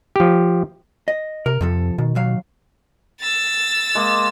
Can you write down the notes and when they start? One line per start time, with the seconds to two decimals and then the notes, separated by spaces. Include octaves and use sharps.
0.16 F3 G4
1.08 D#5
1.46 C3 A#4
1.61 F2 C3 F3 A4
1.98 B2 D#3
2.15 D#2 F#3 F5
3.21 E6 A6
3.95 G#3 A#3